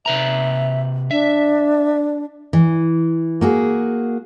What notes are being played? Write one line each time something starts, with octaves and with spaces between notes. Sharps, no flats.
C3 B4 E5 A#5
D4 E5
E3
A#3 F#4 G#4